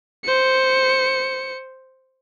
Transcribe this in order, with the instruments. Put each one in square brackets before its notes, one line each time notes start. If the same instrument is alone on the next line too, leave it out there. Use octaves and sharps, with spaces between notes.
[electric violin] C5 C#7